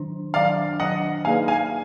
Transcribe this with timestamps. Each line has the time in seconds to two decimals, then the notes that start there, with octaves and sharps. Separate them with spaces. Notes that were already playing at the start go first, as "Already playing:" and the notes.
Already playing: D#3 F#3 D4
0.34 D#3 F#3 D4 D5 F5
0.80 D#3 F#3 D4 D#5 F#5
1.25 A#3 D#4 G#4 B4 D5 F5 G#5
1.48 F5 G#5